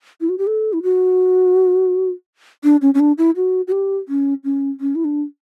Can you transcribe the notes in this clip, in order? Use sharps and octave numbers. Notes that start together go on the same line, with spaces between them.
E4
F#4
G4
A4
E4
F#4
D4
C#4
C#4
D4
E4
F#4
F#4
G4
C#4
C#4
C#4
E4
D4